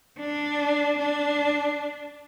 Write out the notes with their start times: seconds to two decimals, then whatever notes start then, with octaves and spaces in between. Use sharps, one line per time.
0.20 D4
0.99 D4